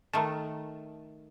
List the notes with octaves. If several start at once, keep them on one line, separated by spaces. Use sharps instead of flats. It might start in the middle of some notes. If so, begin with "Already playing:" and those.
D#3 A3 A#4 A5